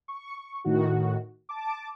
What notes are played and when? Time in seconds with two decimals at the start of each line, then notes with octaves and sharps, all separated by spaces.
0.08 C#6
0.65 A2 D#3 F#4
1.49 A5 D6